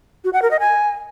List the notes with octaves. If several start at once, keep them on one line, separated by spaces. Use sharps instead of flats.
F#4
F#5
A#4
D#5
G#5